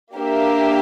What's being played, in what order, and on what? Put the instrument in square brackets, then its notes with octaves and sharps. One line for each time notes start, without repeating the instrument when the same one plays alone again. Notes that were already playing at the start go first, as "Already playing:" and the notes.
[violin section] A#3 D4 G4 A#4 E5